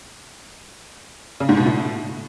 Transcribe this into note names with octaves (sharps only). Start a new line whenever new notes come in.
C#3
G#2
B2
A2